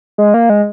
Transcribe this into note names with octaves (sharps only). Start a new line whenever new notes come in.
G#3
A#3
G#3